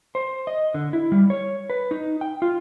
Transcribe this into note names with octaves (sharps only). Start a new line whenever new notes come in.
C5
D#5
D3
E4
G3
C#5
B4
D#4
G5
F4